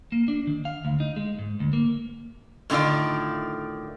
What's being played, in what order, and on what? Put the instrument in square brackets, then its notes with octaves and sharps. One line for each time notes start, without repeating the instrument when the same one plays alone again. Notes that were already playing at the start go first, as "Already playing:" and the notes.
[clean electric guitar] A#3
D4
D#3
F5
D2
D#4
G#3
G#2
D2
A#3
[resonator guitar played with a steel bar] A2 D3 D#3 F4 D5